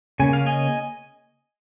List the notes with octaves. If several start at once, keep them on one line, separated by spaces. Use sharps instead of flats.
C#3 A#3 C#4 G#5
F5
D#5 G#5